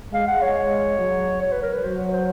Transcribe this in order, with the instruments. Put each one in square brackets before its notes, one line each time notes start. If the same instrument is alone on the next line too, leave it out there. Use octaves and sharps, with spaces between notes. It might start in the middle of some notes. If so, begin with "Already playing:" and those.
[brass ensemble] G#3 [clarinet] F5
[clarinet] F#5
C#5
[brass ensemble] F#3
[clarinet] C#5
B4
A#4
B4
[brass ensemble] F#3 [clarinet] C5
[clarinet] C#5
C5